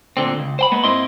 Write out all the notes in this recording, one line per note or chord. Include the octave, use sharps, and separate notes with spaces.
D2 A#2 D3 C4
C#2
C5 G5 B5
G#3 A#3 B3
G#2 A#3 C4 E4 D#5 C6